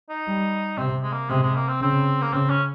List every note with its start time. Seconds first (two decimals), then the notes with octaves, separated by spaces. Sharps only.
0.10 D#4
0.27 G3
0.78 C3 C4
1.03 G#3
1.13 A#3
1.30 C3 G#3
1.42 G#3
1.55 A#3
1.68 C4
1.81 C#3 C4
2.22 A#3
2.33 C#3 C4
2.50 C#4